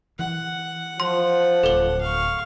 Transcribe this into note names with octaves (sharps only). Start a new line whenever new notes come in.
E3 F#5
F3 C6
D1 A4 G7
F5 C#6